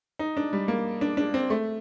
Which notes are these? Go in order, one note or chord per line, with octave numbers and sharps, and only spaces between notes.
D#4
D4
G3
A#3
D4
D4
C4
A3